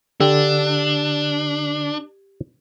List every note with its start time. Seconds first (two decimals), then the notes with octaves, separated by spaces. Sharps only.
0.20 D3 D4 G4 E6